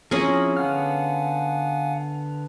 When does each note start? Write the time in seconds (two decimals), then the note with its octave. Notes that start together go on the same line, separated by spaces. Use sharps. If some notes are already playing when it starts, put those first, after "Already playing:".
0.11 F3 C4 C#4 E4 G#4 A#4
0.57 D3 B3 F5 F#5 G#5 F6